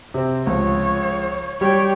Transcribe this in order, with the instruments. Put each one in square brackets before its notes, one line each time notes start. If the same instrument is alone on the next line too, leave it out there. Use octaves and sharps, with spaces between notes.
[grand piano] C3 C4
[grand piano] C#2 F3 [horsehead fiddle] C#5
[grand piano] G3 [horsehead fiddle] C#5 G5